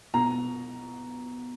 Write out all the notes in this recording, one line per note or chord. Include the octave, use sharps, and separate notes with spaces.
B2 A#5